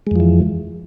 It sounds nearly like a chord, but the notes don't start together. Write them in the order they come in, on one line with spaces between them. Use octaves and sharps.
G#3 F2 F3 E3